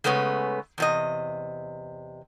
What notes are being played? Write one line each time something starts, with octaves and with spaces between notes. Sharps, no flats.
C#3 G#3 A3 B3 C#4
E2 C3 D#5